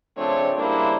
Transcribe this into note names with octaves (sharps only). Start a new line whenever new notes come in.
C#3 F3 A3 C4 D4 C#5
C#3 G3 A#3 D4 E4 C5